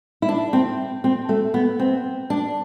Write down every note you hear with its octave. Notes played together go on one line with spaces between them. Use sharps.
E4
D4
C4
C4
A3
B3
C4
D4